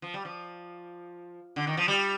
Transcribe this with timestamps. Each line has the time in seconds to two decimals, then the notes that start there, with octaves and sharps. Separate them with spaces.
0.02 F3
0.14 G3
0.25 F3
1.56 D3
1.67 D#3
1.77 F3
1.88 G3